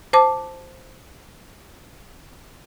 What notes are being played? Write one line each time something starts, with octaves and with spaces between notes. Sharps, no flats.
C5 A5 D6